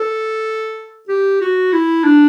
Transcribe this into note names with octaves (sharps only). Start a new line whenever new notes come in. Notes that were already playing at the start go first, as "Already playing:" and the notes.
Already playing: A4
G4
F#4
E4
D4